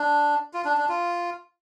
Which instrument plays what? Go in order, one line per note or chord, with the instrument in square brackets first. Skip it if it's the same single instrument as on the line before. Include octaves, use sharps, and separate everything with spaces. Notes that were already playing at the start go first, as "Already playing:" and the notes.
Already playing: [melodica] D4
F4
D4
D4
F4